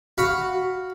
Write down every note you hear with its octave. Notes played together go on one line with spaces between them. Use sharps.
F#4 F5 B5